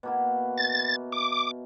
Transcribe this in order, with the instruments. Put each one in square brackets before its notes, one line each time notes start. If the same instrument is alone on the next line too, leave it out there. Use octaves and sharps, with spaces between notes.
[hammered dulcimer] B2 A#3 E4
[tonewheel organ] A6
D6